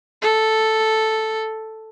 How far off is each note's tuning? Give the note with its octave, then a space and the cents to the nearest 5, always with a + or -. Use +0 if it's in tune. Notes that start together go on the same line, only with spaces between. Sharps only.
A4 +0